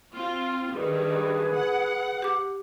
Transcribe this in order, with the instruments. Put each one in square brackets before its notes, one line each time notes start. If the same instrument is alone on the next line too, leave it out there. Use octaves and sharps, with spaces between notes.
[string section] C4 F4 [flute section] C6
[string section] G2 D#3 [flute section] G#4 B4
[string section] F#5
[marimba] G4 D6